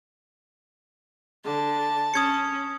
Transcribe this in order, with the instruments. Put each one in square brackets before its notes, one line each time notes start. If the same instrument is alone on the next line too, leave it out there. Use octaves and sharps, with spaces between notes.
[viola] D3 [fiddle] A5
[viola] C#4 [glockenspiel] D#6 G#6 C#7